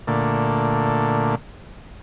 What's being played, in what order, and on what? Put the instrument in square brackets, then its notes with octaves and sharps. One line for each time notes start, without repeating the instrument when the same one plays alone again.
[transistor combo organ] A#2 D3 A3